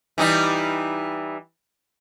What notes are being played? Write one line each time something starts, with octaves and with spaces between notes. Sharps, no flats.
E3 G3 D#4